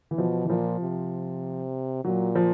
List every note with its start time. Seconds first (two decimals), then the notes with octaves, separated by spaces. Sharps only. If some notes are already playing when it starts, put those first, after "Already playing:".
0.11 E3
0.18 B2 F3
0.44 E3
0.49 A#2 F3
0.81 C3
2.04 A#2 F#3
2.36 F3